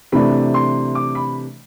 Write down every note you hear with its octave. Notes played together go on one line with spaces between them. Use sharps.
C3 E3 A3 D4 B5
C6
D6
B5